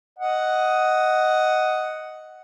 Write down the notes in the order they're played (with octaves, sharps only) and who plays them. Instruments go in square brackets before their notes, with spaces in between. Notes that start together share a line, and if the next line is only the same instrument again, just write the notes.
[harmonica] D#5 F#5